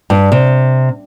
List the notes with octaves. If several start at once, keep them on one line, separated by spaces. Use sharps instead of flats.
G2
C3